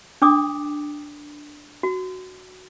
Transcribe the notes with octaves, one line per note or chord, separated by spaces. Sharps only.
D4 G5 D6 D#6
F#4